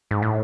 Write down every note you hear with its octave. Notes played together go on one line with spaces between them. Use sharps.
G#2
A2